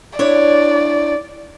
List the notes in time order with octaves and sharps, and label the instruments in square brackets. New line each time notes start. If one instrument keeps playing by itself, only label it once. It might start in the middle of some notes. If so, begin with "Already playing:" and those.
[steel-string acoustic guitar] D4 E4 C#5 [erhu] D5